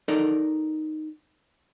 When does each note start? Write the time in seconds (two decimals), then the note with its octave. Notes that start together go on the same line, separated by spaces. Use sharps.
0.08 D#4 A4 A#4 D5